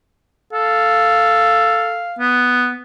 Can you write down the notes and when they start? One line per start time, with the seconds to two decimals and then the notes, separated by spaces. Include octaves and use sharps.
0.53 A4 F5
2.19 B3